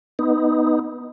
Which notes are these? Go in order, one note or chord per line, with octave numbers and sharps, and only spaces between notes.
B3 D#4